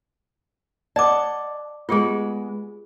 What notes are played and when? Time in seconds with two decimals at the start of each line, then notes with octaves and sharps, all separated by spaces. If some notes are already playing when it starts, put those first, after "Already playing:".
0.96 D5 D#5 F#5 A5 D6
1.89 G#3 B3 F4 G4 G#4